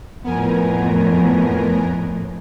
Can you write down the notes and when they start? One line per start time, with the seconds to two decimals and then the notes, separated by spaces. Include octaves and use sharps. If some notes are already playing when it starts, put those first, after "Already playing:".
0.24 F2 A2 B3 A#4 G#5